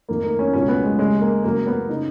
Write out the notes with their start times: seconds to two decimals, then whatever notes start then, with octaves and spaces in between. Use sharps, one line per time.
0.09 F2 D#3 A#3
0.24 A#3
0.39 C#4
0.53 C#2 B2 C#4
0.68 B3
0.84 G#3
0.99 D#2 C#3 G#3
1.21 A#3
1.44 F#2 C#3 A#3
1.66 B3
1.89 C#3 D#4